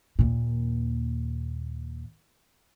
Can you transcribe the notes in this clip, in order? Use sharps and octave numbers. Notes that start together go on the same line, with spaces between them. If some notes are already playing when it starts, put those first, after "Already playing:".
D#2 A#2